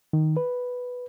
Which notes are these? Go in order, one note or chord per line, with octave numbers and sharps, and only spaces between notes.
D#3
B4